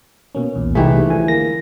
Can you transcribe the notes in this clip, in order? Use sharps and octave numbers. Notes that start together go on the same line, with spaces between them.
B2 A#3 C#4
B1 E2 A#2
C2 E3 A3 D#4 G4 G#4
D3 F3 G#5
A#3 A#6